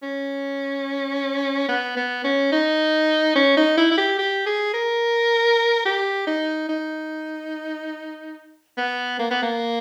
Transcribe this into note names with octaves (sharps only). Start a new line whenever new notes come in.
C#4
B3
B3
C#4
D#4
C#4
D#4
E4
E4
G4
G4
G#4
A#4
G4
D#4
D#4
B3
A#3
B3
A#3